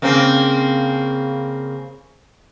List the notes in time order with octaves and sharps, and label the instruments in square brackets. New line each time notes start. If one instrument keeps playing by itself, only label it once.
[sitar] C#3 A#3 C4